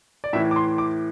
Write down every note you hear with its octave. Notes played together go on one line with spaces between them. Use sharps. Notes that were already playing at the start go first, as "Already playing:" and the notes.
D5
A2 E3 E5
D6
C6
D6